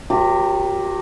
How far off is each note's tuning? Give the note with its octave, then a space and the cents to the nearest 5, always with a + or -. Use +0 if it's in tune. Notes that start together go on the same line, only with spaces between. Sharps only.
F#3 -40 G4 +0 A#4 +0